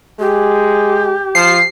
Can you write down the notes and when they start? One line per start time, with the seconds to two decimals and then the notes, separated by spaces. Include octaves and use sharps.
0.19 G#3 G4
1.35 F3 C7